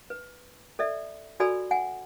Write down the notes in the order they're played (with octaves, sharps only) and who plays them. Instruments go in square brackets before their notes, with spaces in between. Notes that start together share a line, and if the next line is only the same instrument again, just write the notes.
[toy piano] B4
A4 D5 E5
F#4 A4 D5 G#5 B5 E6
F#5 G#5